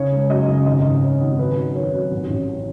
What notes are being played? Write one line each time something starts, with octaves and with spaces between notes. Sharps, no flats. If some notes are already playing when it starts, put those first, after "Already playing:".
Already playing: C#3 C#5
G#3
F#2 D#5
C#3
G#1 D#5
G#1
G#1 C#5
G#1
F#2 B4
F#2
D#3 C#5
F#2
A1
A1